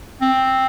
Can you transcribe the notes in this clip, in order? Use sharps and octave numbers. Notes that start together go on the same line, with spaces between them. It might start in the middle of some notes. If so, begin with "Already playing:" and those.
C4